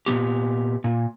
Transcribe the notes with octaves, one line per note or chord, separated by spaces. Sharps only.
A#2 E3 B3 G4
A#2